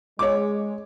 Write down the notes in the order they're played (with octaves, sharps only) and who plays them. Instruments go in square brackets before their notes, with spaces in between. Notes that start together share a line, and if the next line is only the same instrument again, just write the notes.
[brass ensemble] G#3 [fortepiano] C#5 D6